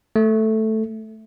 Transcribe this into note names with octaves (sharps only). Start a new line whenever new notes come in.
A3